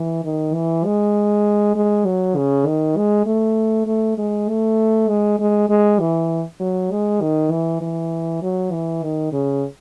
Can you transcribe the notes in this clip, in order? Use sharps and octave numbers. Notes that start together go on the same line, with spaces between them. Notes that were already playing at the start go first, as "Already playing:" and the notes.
Already playing: E3
D#3
E3
G#3
G#3
F#3
C#3
D#3
G#3
A3
A3
G#3
A3
G#3
G#3
G#3
E3
F#3
G#3
D#3
E3
E3
F#3
E3
D#3
C#3